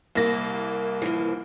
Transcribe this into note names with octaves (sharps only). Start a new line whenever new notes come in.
C2 A#3 A#6
E3 F3